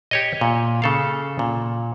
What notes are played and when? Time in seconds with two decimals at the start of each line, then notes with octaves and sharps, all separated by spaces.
0.11 G4 C#5 D#5
0.41 A#2
0.82 C#3 A4 F5
1.39 A#2